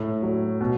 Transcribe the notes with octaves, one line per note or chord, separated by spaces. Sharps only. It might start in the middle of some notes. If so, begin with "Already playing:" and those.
Already playing: A2
F#3
B2